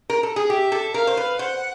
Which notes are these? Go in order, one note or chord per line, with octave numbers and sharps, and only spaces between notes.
A#4
A4
G#4
G4 E5
A4
A#4 F5
C5
B4
C5 F#5